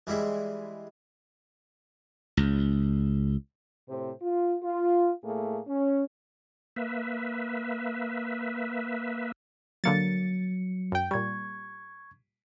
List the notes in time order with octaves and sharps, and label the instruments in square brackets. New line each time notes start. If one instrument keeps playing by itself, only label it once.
[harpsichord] E3 G3 G#3 E4
[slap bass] C#2
[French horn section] A2 C3 C5
F4
F4
A2 A3 A#3 G#4
C#4
[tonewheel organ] A#3 B4 E5
[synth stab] D3 A#3 A6 [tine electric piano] F#3 C#7
[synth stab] F#2 G5
[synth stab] A#2 G3 [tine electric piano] C#6 G#6